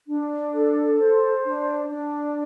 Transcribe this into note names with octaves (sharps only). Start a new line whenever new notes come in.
D4
A4
C5
D4
D4